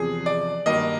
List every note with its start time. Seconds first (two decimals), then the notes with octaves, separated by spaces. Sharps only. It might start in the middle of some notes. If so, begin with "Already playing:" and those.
Already playing: E2 C3 F3 G#4
0.26 D5
0.66 G2 D#3 F#3 A#3 D#5